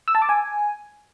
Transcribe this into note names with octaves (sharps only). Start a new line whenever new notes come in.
E6
A5
D6
G#5